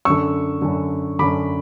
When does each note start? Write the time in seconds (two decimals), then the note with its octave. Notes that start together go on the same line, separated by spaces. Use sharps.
0.05 F#2 D3 C#6 E6
0.62 F#2 D3
1.19 F#2 D3 B5 D6